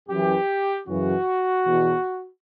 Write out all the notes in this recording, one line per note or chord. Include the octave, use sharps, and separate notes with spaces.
F#2 E3 G4
F#2 C#3 E3 F#4
E2 B2